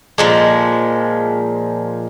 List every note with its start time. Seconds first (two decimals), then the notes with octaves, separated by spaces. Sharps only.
0.18 A#2 F3 G#3